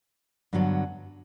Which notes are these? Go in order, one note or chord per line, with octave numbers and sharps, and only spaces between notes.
G2 D3 F#3 B3